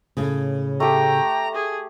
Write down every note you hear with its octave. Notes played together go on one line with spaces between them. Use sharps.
A2 C#3
A3 G4 G5 A#5
G#4